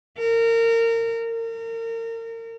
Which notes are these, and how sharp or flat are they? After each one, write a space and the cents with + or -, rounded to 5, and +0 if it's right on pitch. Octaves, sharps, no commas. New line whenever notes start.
A#4 -25
A#4 -35